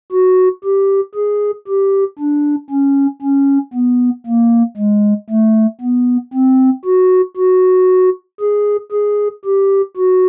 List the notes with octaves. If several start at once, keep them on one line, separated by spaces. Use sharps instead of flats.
F#4
G4
G#4
G4
D4
C#4
C#4
B3
A#3
G#3
A3
B3
C4
F#4
F#4
G#4
G#4
G4
F#4